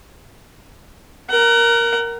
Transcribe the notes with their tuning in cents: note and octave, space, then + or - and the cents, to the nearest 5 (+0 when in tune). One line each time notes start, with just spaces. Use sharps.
A#4 +0 F#5 +30